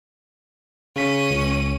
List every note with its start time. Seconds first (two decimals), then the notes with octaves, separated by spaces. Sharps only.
0.96 C#3 C#4 B6 D#7
1.30 C#2